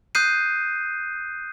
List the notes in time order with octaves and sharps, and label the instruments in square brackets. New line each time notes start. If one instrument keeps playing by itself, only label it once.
[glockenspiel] D#6 F#6 G6 C7 D#7